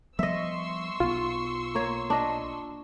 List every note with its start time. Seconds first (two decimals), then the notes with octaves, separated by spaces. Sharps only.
0.19 F3 G3 B3 D#5 E5 C6 C#6 E6
1.00 B1 B3 F4
1.75 A#3 C#5
2.10 D4 D#5